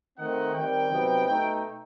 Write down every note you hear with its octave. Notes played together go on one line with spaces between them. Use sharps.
D#3 A3 C4 D#4 F#5
D#3 G3 C4 G5
C3 F#3 B3 D#4
B2 A3 D#4